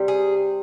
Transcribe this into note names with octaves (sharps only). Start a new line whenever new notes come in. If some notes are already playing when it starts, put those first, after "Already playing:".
Already playing: C3 G3
G#4